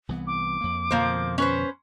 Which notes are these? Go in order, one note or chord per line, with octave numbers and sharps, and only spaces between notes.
C2 E3 B3
D6
F2 A#3
F2 B2 D3 F3 A#3 C5
C#4 B4 C5